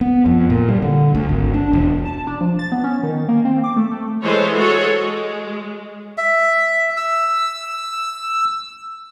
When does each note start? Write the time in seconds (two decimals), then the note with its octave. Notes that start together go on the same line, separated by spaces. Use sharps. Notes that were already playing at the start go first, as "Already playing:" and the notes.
0.01 B3
0.26 F2
0.50 A#2
0.68 G3
0.82 D3
1.15 D2
1.29 G#1
1.54 D4
1.73 E1
2.05 A5
2.27 D4
2.41 F3
2.59 A6
2.72 B3
2.84 C#4
3.03 D#3
3.28 A#3
3.45 C4
3.64 D6
3.77 A3
3.91 A3
4.24 E3 G#3 A4 C5 C#5
4.56 F#4 G#4 A4 C#5
4.99 G#3
6.18 E5
6.97 E6